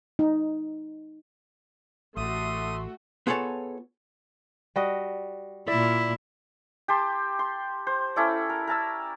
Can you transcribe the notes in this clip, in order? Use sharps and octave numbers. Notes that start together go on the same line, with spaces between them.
D#4
A1 A3 F#4 D5 E5 C6 D#6
B3 F4 G#4 A4 C#5 A5
G3 F#4 D#5
A#2 E4 D5 E5
G4 A5 C6
C6
C5
C#4 E4 A4 D5
A#4
A#4 A5 E6